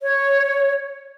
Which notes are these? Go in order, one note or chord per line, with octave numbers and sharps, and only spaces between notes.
C#5